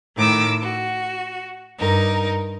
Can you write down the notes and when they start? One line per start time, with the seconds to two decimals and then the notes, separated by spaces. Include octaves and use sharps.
0.16 A2 D#3 D6 E6
0.61 F#4
1.78 G2 D#4 A#4